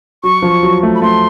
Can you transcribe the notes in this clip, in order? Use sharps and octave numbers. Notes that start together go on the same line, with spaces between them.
F#3 C#6
F3
F#3
A3
B5
A3 C6